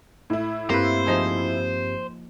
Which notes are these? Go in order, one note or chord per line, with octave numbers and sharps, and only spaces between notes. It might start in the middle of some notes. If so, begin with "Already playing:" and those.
A2 E4
G2 A#3 C4 G4 B4 C5
F3 D#4 G#4